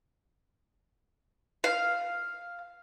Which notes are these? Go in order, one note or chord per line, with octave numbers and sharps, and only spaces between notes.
F5